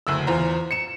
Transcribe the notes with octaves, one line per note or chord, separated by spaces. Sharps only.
F#1 D2 E6
E2 F4 C5 A#5
C#7 E7